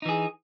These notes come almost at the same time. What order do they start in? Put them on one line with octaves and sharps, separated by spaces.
D#4 E3 G#4